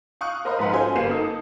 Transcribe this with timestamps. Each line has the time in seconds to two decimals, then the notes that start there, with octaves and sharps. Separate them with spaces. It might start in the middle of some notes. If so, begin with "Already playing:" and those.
0.21 F5 C#6 D#6 F#6
0.45 A#4 C5 D#5 F5 A#5 B5
0.59 A#1 G#2 B4 F#5
0.73 C#4 F4 F#4 A4 C5 G#5
0.95 G1 G3 A#3 B4 C7 E7
1.09 A#3 D#4 A4